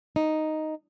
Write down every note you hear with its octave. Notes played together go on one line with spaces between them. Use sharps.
D#4